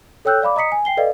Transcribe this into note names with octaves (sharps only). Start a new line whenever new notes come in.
A4 C#5 G5 E6 F#6 G6
D5 F5 B5 D6
D#5 A#5 D#6 B6 C#7
G#5
G5 C7 G7
A4 B4 D5 D#5 F5